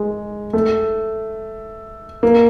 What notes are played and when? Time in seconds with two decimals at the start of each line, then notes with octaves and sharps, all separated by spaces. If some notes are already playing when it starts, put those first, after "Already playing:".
Already playing: G#3
0.53 A3
2.23 A#3